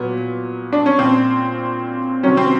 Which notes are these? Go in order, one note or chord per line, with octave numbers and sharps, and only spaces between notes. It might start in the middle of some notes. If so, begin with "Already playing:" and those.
Already playing: A#2 F#3 B3
D4
C#4
A#2 F3 C4
C3 D#3 F#3 C#4
C4